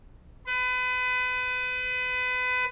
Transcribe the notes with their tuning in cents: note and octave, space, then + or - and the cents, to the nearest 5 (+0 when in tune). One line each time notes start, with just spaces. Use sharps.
B4 +30